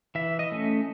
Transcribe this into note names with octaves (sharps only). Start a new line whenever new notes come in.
E3 E5
D#5
A3 C#4